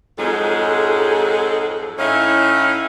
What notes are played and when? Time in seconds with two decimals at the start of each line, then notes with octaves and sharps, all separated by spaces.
0.18 F2 G#2 F#3 G#3 G#4 A4
1.98 A2 C#4 D#4 E4 C#5 F5